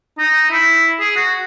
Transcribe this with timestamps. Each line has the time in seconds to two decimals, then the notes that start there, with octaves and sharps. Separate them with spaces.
0.18 D#4
0.51 E4
1.00 G#4
1.16 F#4